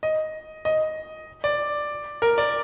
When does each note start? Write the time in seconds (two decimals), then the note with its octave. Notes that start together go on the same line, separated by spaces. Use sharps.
0.03 D#5
0.65 D#5
1.44 D5
2.22 A#4
2.38 D5